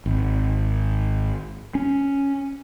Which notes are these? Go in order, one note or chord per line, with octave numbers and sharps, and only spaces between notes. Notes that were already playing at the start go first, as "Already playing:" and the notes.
G#1
C#4